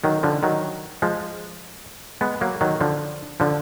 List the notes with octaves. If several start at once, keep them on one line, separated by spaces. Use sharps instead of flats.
D#3 F#3
D3 F3
D#3 F#3
F3 G#3
G#3 B3
F#3 A#3
D#3 F#3
D3 F3
D3 F3